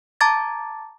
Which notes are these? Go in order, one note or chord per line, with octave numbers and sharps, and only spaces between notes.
A5 A#5 D6 G#6 A6